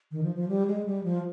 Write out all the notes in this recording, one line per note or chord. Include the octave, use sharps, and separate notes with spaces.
D#3
F3
F3
G3
G#3
G3
F3